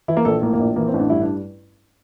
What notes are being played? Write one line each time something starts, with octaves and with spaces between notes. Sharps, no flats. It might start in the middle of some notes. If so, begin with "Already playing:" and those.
E3 E4
A#3
A#1 A4
A2 A#3
A#3
A#1
E3 A#3
C4
A1
D4
G2 E4
D4